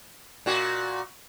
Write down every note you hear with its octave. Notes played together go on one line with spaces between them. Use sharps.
A#2 F#4